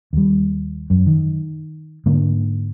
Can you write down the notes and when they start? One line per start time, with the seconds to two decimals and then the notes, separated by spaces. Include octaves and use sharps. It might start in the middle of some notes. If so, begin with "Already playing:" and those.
0.13 D#2 G3
0.90 F#2
1.07 D#3
2.06 G#2 D3 A#3